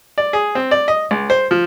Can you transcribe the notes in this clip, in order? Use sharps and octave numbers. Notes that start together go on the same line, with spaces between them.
D5
G#4
C4
D5
D#5
C#2
C5
F3